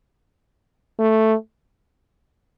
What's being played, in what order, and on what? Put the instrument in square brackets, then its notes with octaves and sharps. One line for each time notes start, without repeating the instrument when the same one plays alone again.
[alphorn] A3